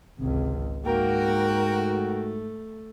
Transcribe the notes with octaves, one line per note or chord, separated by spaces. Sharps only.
G#1 C#2 C3
G#2 A#3 F#4 A#4 G5
A3